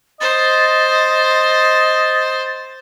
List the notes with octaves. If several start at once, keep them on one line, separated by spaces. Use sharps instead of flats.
C5 D#5 A6